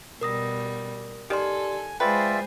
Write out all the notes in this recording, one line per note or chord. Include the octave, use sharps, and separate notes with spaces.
B2 G3 A#4 D#6 A#6
D#3 G4 A4 D5 G#5 C6
G#3 F4 G#4 B4 C5 D5 E5 G5